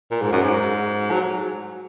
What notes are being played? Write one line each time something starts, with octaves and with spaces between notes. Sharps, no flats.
A#2
G#2
F#2
G#2
F#3